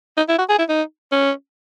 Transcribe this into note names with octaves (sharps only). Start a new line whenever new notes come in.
D#4
E4
F#4
G#4
E4
D#4
C#4